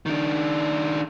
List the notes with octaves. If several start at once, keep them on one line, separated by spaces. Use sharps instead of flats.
D#3 D4